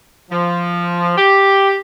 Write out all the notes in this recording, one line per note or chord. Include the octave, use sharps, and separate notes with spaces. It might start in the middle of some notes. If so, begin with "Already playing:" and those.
F3
G4